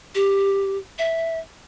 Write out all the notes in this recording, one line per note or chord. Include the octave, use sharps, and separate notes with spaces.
G4
E5